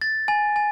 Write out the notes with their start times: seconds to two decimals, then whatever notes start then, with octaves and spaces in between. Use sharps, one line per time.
0.01 A6
0.28 G#5
0.56 G#5